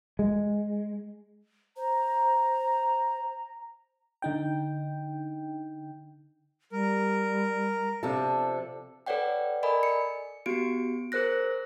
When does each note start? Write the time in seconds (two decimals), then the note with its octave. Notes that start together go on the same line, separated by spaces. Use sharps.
0.19 G#3
1.76 C5 A#5
4.22 D3 D#4 G5
6.72 G3 A#4
8.03 C3 F3 D4 A4
9.06 A4 B4 C#5 D5 F#5 G5
9.63 A4 A#4 D5 D#5 G#5 B5
9.83 C#7
10.46 B3 F#4 G4 D7
11.12 G#4 A#4 C5 F#6 A#6